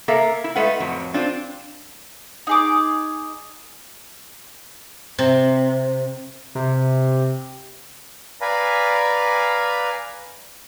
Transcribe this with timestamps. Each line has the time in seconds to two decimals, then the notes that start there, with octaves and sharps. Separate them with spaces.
0.08 A#3 A4 A#4 E5 F5
0.44 E4
0.56 G#3 A3 B4 F5 F#5
0.80 F2 A2 F#3
1.14 C4 D4 F4
2.47 D#4 G#4 D6
5.19 C3
6.55 C3
8.41 B4 D5 F5 G#5 A#5 B5